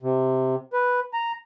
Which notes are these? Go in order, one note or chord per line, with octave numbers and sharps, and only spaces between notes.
C3
B4
A#5